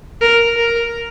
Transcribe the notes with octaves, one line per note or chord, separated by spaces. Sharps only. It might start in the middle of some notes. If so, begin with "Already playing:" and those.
A#4
A#4